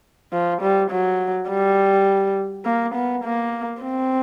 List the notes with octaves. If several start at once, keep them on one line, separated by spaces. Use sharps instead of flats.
F3
G3
F#3
G3
A#3
B3
A#3
C4